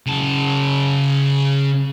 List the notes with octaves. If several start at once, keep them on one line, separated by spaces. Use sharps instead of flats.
C#3 A5